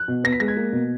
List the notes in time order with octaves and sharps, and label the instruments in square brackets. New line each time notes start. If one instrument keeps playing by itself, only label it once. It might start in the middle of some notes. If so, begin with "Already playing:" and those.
Already playing: [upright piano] F#6
B2
B3 A#6
B6
G#3 A#6
G#6
A#3
B2